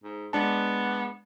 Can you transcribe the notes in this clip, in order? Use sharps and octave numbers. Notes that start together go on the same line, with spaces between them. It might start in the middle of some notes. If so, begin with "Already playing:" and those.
G#2
G#3 B3 D4 A5